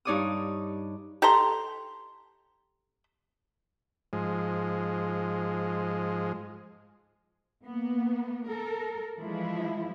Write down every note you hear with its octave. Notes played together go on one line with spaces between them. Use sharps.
G2 D#4 C#5 D5 D6 D#6
G4 A4 A#5 C6
G#2 F3 G#3
A#3 B3
A4 A#4
E3 F3 G#3 E4 F4